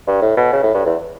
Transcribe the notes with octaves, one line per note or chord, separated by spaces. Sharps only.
G2
A2
B2
C#3
A2
G2
E2